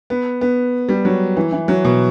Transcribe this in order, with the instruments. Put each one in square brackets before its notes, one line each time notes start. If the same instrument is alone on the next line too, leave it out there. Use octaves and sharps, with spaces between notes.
[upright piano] B3
B3
G3
F#3
E3
E3
F#3
B2